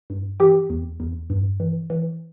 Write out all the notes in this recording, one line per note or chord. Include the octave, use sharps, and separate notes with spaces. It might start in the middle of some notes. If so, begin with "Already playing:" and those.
G2
E3 G4 G5
E2
E2
G2
E3
E3